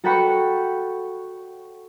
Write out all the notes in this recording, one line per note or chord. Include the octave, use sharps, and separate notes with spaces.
F#4 A4 F#5 G5 B5 C#6